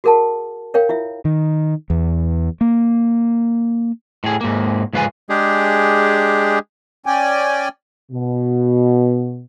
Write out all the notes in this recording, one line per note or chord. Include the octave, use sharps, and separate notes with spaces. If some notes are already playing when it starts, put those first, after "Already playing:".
F#4 G#4 A#4 F#5 A5
A#4 C#5 F5 G5
E4 F4 E5
D#3
E2
A#3
A2 G#4
G#2 A#3
C#2 G#2 F4 B4 G#5
G#3 D4 G4 G#4
C#4 D5 G5 G#5
B2